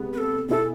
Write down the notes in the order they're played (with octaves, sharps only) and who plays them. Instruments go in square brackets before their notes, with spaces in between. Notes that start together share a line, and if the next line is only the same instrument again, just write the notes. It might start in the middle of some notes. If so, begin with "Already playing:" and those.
Already playing: [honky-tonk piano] C3 G#3 B3
[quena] B4
A4
[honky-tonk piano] B2 B3 E4 G#4 [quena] A4